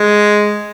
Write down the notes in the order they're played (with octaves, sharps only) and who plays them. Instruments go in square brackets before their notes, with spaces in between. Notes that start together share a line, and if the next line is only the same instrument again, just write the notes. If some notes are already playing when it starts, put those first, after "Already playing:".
Already playing: [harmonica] G#3